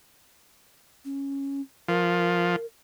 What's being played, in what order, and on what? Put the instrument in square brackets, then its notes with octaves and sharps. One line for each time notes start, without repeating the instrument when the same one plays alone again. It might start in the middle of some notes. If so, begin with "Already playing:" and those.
[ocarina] C#4
[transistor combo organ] F3 [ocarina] A#4